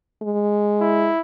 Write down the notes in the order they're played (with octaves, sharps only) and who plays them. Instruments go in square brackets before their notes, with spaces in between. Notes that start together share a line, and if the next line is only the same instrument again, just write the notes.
[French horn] G#3
[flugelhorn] E4